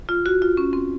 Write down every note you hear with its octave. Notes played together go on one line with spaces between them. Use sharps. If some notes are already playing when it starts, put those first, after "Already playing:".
F4
F#4
F4
C#4
C4